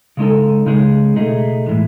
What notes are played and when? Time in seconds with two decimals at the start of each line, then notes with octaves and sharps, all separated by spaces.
0.17 C#3 G#3 D#4 A4
0.66 C#3 G#3 D#4 G#4
1.16 B2 A3 D#4 G#4
1.66 A2 E3 G#3